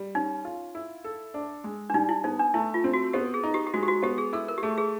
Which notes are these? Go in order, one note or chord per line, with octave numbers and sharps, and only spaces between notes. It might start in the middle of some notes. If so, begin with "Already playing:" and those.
Already playing: G3
C#4 D#4
F4
E4
A4
D4
G#3
D4
G3 D#4
E4
B3 D#4
D4
A3 E4
F4
C4
F#4
B3 G4
G#4
D#4
G4
G4
G#3 F#4
G4
F#4
B3 G4
G#4
E4 A4
A#4
G4
A3 G#4
G#4